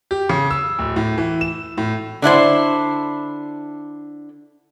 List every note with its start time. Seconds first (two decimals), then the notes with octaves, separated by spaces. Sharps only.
0.11 G4
0.29 C#3
0.50 E6
0.79 D1
0.96 A2
1.18 E3
1.41 E7
1.78 A2
2.22 D3 D4 E4 C5